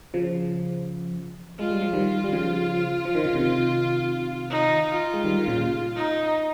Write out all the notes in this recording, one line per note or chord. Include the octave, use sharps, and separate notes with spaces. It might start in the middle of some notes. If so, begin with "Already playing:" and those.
C#3 F3
G#3 F4
G3
F3
D#3 G3
G3
C#3 F3
F3
D#3
C#3
C3 D#3
D#4
F4
G#3
D#3 G3
D#3
A#2 C#3
D#4